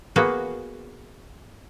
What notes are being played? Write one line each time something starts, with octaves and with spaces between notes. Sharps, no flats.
A#3 B3 F#4 G#4